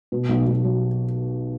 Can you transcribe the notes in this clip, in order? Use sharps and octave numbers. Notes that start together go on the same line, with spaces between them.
B2
B1
B1
F#3